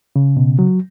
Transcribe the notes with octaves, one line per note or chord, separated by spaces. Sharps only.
C#3
B2
F#3